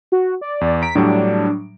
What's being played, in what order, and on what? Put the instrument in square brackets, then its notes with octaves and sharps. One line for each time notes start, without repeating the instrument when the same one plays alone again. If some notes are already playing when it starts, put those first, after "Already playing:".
[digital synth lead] F#4
D5
[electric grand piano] E2
[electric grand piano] A#5 D7 [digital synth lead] B6
[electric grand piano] A2 F#3 G3 [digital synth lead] D4